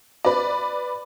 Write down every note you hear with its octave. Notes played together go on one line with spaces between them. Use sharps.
B4 D5